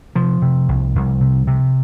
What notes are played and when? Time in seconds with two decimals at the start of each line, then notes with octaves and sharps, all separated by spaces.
0.15 C3 F3
0.42 C3
0.69 C2
0.95 C2
1.21 C3
1.47 C3